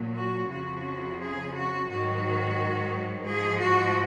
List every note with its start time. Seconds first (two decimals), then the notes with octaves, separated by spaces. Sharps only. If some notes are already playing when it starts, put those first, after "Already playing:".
Already playing: A#2 F#3
0.16 F#4
0.50 F2 C#3 F3 F#4
1.20 G#4
1.53 F#4
1.88 G#2 D#3 F#3 F#4
3.25 G#2 F3 G#4
3.60 F#4